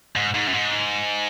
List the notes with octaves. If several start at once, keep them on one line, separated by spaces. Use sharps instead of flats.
G#2
G#2
F#2
G#2